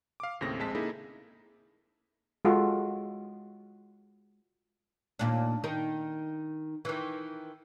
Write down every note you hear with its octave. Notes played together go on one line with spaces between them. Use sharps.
F5 D6
D#2 A2 C#3 C4 A#6
A#1 G#3 C4 A5 B6
C#3 A#3 D#4 E4 G#4 A4
G#3 F4 F#4 A4
D#2 A#2 D4
D#3 D#4 A#4
D#3 E3